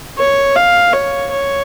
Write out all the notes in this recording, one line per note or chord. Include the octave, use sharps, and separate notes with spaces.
C#5
F5
C#5
C#5